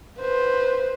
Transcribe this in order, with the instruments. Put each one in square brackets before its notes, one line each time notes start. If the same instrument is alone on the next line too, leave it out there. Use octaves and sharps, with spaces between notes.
[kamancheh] B4 C5